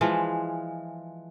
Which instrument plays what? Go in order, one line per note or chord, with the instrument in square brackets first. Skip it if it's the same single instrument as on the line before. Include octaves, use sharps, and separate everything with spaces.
[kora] E3 F3 G#3